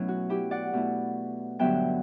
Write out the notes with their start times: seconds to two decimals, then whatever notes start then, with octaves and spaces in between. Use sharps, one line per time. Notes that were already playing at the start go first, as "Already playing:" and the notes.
Already playing: B2 F#3 A3 C#4 E4
0.08 F#4
0.29 E4 G4
0.51 D5 F#5
0.73 B2 A3 E4
1.59 G2 D3 F#3 B3 E5 G5